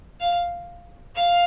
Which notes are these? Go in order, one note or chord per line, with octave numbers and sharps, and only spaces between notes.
F5
F5